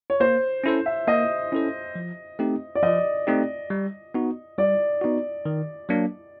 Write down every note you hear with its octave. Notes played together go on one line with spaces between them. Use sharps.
C#5
A#3 C5
C#4 E4 A4 C5
E5
A#3 D#5
C#4 E4 A4 C5
F3
A3 C4 D#4 G4
D5
F3 D#5
A3 C4 D#4 G4
G3
B3 D#4 F#4
G3 D5
B3 D#4 F#4
D#3
F#3 A#3 D4